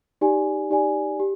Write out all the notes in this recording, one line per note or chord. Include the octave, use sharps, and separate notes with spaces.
D#4 G4 D5 G#5
D#4 G4 D5 G#5
G4